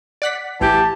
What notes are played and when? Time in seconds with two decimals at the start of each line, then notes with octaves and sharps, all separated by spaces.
0.22 D5 F#5 B6
0.61 A1 E3 G4 A5